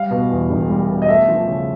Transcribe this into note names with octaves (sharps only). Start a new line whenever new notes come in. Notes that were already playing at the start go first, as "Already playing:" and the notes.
Already playing: G3 F5
B2
E2
E1
G3
B2
D#5
A3 E5
F3
C#3